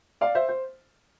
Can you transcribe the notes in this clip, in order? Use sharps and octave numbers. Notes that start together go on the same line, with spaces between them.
D5 F5
C5 E5
C5